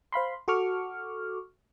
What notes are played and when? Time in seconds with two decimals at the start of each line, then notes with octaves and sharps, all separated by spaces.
0.12 C5 F5 B5 C6
0.48 F#4 A4 C#6 D6 F6